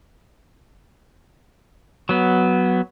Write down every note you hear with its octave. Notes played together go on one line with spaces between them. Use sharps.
F#3 B3